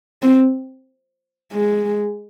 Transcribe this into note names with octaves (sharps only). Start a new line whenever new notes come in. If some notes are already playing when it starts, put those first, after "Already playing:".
C4
G#3